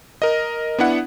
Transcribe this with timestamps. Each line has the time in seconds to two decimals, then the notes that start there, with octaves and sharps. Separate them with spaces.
0.22 A#4 D#5
0.78 B3 D4 E4 F#5